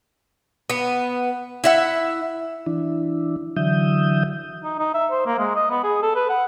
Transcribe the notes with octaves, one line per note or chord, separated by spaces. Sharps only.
B3
E4 E5 F#5
E3 D4 E4
D3 E3 F#3 E5 D#6 G6
D#4
D#4
E5
C5
A#3
G#3
D#5
B3
G#4
A4
B4
F#5